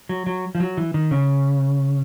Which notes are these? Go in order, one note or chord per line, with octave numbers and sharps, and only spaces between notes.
F#3
F#3
F3
F#3
E3
D#3
C#3